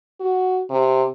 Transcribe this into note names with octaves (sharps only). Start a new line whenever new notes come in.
F#4
C3